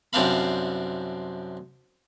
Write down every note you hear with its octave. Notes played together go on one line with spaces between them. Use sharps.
C2 F#2 C4 D4 F5 B5